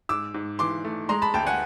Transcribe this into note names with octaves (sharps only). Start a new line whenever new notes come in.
G#2 D6 E6
G#2
E3 C6 D6
A3
G#3 A#5 C6
A5 B5
D2 G5 A5
F#5 G#5